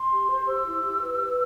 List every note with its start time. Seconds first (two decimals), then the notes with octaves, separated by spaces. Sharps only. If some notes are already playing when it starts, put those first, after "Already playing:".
Already playing: C6
0.11 G4
0.30 C5
0.47 G4 E6
0.65 E4
0.84 G4
1.02 B4
1.20 B4